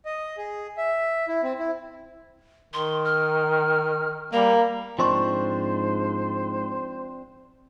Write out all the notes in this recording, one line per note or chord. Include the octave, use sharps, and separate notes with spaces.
D#5
G#4
E5
E4
C4
E4
D#3 C6
F6
G3 A#3 A#5
G#2 F3 C4 D4 C5 D#5 C6 C#6